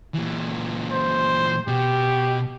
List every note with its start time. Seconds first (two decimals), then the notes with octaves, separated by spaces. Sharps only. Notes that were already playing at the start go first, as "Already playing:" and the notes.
0.14 A#2 E3
0.92 C5
1.68 B2 G4